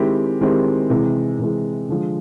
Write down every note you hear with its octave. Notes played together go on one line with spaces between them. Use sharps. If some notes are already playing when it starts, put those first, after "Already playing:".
Already playing: D#3 G#3 C4 E4 G4
D#3 G#3 C4 E4 G4
C3 E3 G#3
C3 E3 G#3
D3 F3 G#3